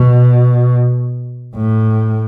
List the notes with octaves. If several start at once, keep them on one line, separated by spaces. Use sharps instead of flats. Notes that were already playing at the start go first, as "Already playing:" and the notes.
Already playing: B2
A2